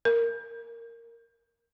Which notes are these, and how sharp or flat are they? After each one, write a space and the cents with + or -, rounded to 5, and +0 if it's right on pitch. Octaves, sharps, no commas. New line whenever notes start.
A#4 -10